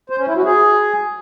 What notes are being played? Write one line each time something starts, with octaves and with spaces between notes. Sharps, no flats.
C5
C#4
E4
F#4
G#4